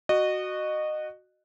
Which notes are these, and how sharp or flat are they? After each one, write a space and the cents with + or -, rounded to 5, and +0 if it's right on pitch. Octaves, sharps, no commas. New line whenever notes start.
F#4 +0 D#5 -25